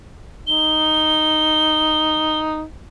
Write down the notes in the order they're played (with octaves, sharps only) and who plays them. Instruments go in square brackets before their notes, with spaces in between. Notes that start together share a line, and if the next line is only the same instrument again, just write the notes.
[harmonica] D#4 [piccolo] G7